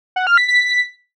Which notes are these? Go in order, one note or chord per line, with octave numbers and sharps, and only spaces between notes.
F#5
F6
B6
B6